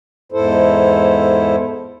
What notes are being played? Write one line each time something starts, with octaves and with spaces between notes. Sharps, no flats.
E2 G#2 E4 A4 C5